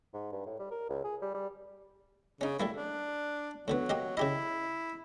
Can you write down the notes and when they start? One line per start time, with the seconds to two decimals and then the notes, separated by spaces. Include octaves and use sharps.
0.14 G#2
0.32 G2
0.46 A2
0.59 G3
0.71 A#4
0.89 C#2
1.04 G#4
1.22 G3
1.34 G3
2.41 C#3 C#4 D#4
2.60 G3 A3 A#3 E4
2.77 D4
3.68 A2 D3 F#3 B3
3.89 A#3 G4 D#5
4.17 C#3 E4 G4 D#5